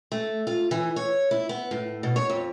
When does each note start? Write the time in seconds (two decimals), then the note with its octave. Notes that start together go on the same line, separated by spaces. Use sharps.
0.12 A3
0.47 F4
0.71 E3
0.96 C#5
1.31 E4
1.49 B3
1.71 A2
2.03 B2
2.16 C#5
2.30 F2